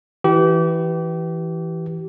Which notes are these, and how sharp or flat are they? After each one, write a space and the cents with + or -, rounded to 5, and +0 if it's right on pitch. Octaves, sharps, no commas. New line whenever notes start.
E3 +0 G4 -30